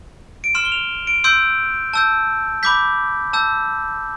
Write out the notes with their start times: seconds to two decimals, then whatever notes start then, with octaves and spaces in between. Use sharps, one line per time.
0.44 D7
0.55 C6 F6 E7
0.65 G7
0.72 F7
1.07 D7
1.24 C6 E6 G6 D7
1.94 A5 E6 G6
2.63 B5 D6 G6 B6
3.33 A5 E6 G6